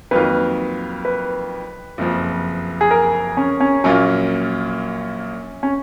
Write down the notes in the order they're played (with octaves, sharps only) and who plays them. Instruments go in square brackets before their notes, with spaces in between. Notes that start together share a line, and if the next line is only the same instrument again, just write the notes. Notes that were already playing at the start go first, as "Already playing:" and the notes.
[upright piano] F2 D#3 F#3 A#3 F4 [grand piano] B4
[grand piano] B4
[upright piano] F#1 F2 F3
[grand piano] G#4
A#4
C#4
C#4
[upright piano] A#1 A#2 F#3 A#3 F4 [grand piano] C#4
[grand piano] C#4